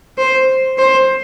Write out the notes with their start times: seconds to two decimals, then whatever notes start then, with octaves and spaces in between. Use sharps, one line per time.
0.18 C5
0.78 C5